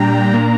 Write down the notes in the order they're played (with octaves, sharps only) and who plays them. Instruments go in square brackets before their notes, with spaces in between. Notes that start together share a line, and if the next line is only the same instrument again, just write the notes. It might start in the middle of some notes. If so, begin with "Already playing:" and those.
Already playing: [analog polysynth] A#2 G3 D4 G5 A#5
A#2 A#3 D4